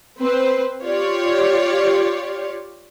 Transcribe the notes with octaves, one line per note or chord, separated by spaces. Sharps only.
C4 B4 C5
F4 G4 C#5 D5